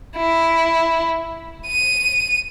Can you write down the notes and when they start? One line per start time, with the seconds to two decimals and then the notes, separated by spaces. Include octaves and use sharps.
0.17 E4
1.67 D#7